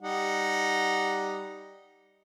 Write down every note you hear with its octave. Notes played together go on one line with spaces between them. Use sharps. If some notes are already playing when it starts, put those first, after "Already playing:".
G3 D#4 F#5